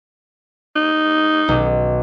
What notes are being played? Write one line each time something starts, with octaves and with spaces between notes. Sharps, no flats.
D#4
B1